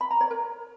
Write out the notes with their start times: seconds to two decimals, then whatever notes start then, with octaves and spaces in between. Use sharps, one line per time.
0.01 B5
0.11 A#5
0.21 C#5
0.31 A#4